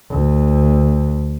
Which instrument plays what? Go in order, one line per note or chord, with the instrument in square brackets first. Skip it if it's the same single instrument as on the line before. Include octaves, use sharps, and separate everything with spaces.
[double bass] D2